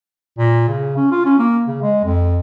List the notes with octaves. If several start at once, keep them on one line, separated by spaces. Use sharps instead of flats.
A#2
C#3
C#4
F4
C#4
A#3
C#3
G#3
F2